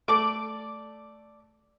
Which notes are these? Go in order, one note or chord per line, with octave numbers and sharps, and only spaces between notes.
A3 D5 D6